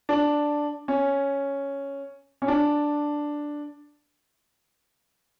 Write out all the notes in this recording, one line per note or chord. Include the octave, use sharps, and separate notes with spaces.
D4
C#4
C#4
D4